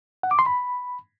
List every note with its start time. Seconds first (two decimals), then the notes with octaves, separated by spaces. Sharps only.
0.23 F#5
0.31 D6
0.39 C6
0.46 B5